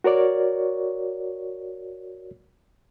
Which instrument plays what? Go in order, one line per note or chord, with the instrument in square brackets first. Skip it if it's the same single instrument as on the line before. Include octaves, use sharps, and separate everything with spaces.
[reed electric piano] F#4 A#4 C#5 D5